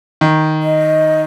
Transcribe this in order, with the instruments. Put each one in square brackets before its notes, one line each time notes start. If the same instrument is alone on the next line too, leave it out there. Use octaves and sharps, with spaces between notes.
[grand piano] D#3
[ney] D#5